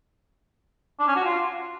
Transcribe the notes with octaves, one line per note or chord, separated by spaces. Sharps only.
D4
C#4
F#4
F4